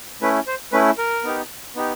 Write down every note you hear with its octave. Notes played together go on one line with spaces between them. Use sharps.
A3 C#4 E4 B4
C5
A3 C#4 E4 B4
A#4
B3 D#4 G4
B3 D#4 G4